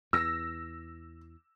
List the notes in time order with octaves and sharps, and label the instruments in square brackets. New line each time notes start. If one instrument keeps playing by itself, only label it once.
[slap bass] E2 [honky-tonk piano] E6 A#6